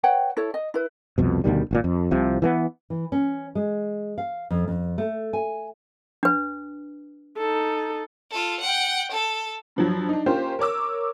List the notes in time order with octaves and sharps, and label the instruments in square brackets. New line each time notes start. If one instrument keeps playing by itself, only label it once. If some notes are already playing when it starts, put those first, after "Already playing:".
[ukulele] B4 C#5 F#5 G5
E4 A4 C#5
D#5
E4 B4
[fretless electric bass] C2 F2 B2
D2 B2 D#3 G3
G#1 F#2 A#2
F2
C2 C3 F3
E3 A3 B3
[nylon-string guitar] E3
C#4
G#3
F5
F2
F2
A3
G#5
[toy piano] D4 B4
[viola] D#4 A4
[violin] F4 A4
F#5 G5
A4
[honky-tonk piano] G2 F3 F#3
D4 D#4
A#3 C#4 F4 G4 A#4 C5
A#4 C#5 D6 E6